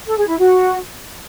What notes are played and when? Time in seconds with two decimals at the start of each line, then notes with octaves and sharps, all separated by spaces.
0.07 A4
0.17 G#4
0.28 E4
0.39 F#4